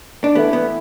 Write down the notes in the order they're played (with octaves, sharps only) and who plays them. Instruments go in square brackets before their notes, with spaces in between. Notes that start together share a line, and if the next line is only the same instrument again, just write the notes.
[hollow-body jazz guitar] D4
[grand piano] E3 A3 E4 [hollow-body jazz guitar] B3
[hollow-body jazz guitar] B3